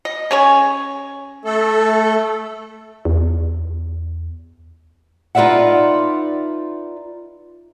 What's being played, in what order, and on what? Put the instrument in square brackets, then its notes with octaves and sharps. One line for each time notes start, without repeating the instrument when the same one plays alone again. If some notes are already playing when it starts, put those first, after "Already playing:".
[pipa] D#5
C#4 G#4 C#5
[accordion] A3 A4
[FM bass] E2
[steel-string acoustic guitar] D#4 F4 B4 D5 E5 F#5